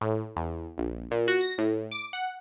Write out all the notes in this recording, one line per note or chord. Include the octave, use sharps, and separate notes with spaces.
A2
E2
A#1
A#2
F#4
A#6
A2
D6
F#5